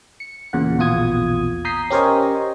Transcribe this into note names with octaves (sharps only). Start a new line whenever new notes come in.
C#7
E2 A#2 C#3 F#5
A#1 E2 B2 F4 D#6 G#6
A#5 D#6 G6 B6 C7
C#4 G4 A#4 C5 C#5 D#5